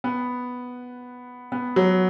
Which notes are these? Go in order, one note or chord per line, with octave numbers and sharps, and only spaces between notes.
B3
B3
F#3